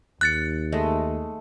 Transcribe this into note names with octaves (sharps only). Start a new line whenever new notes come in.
D#2 F#6 A6 C#7
G#3 A3 D#5